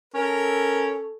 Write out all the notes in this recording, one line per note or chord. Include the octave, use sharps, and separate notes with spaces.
C#4 A4 A#4